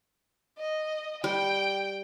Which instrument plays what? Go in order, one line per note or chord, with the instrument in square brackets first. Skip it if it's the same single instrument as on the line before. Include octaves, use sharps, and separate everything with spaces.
[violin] D#5
[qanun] G3 [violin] G5